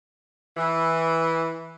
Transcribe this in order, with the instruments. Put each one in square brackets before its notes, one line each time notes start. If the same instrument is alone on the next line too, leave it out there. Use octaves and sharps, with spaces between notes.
[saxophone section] E3